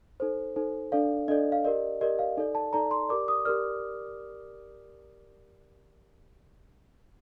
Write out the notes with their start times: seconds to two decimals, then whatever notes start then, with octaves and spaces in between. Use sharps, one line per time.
0.20 D#4 A4 C5
0.56 D#4 A4 C5
0.92 D4 A4 D5 F5
1.28 D4 A4 D5 D#5
1.52 F5
1.64 G4 A#4 D5 D#5
2.01 G4 A#4 D5 D#5
2.19 F5
2.37 D#4 A4 D5
2.55 A5
2.73 D#4 A4 D5 A#5
2.91 C6
3.09 G4 A#4 D5 D6
3.28 D#6
3.45 G4 A#4 D5 F6